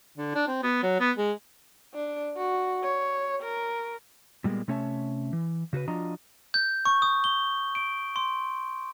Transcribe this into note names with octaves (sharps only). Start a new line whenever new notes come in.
D3
D4
C4
B3
F#3
B3
G#3
D4
F#4
C#5
A#4
A#2 G3 G#3 A#3 B3
C3 A3 C#4 C#5 E5 A5
E3
C#3 F#4 G#4 B4
F3 D4 F4 F#4 D#5 A#5
G6
C#6
D#6
G7
D7
C6